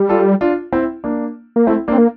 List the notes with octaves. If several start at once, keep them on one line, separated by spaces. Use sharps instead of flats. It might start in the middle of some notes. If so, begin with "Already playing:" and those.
Already playing: G3
F4 A4
D4 F4
C4 E4
A#3 D4
A#3
A3 C4 E4
A#3 D4
C4
A#3